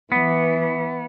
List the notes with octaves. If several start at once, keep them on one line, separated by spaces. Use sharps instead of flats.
E3 B3